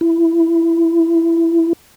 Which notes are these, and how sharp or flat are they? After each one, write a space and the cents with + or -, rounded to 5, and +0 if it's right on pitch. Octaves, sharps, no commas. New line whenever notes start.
E4 +15